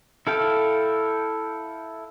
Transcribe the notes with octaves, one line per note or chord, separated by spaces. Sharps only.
E4 A4 F5 G5